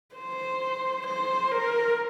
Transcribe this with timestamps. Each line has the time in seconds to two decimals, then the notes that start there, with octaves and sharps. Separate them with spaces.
0.15 C5
1.06 C5
1.51 A#4